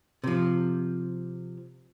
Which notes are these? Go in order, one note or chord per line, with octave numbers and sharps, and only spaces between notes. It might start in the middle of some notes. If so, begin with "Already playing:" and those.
C3 F3